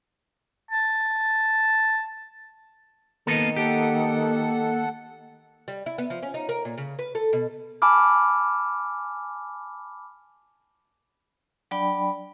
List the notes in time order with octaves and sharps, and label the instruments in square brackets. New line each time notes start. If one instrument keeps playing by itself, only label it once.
[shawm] A5
[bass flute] D#3 [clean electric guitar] A#3 B3 A4
[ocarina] A#3 [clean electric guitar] G4 [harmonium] A4 F#5
[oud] G3
E4
B3
F3
C#4
D#4
A#4
A#2
C#3
B4
A4
B2
[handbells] G#5 A5 B5 D6 F6
[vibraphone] F#3 D4 D5 G5 B5